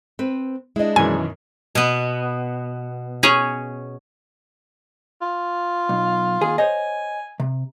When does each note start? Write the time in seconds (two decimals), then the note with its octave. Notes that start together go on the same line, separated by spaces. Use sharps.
0.19 C4 B4
0.76 G#3 D4 E4 D#5
0.96 F#2 B2 D#3 E3 G#5
1.75 B2 B3
3.23 C#4 G#4 C#5
5.21 F4
5.89 B1
6.41 D#2 G#4
6.58 C5 C#5 D#5 G#5
7.40 C3